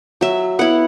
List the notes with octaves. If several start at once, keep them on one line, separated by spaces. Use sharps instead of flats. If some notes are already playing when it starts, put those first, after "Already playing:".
F#3 E5
B3 E4 F#5